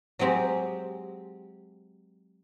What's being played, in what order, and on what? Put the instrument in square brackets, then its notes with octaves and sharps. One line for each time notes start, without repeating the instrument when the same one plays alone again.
[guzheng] F#3 G#3 C4 G4